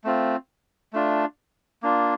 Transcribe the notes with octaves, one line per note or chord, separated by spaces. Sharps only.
A3 C4 F4
A3 D4 F4
A#3 D4 F4